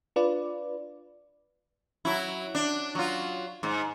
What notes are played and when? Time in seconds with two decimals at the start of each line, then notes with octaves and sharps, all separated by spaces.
0.16 D4 F4 B4 D5
2.05 F#3 E4
2.55 D4
2.95 F#3 F4
3.63 G#2